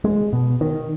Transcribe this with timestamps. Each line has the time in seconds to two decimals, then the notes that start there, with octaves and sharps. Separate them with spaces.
0.04 G#3
0.33 B2
0.61 D#3